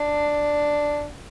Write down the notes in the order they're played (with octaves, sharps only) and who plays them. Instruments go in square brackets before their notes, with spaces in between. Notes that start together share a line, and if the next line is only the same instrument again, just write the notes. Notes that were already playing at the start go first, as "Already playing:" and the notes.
Already playing: [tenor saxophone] D4